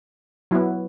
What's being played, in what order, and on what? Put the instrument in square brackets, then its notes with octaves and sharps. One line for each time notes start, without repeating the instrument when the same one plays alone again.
[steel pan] F#3 B3 E4